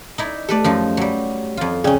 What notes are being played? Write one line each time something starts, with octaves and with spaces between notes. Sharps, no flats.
D#4 E4 D5
A3 G4 A4 B4 D5
F#2 F3 D#4
F#3 G3
F2 F4
C#3 C#4 G#4 D5 G5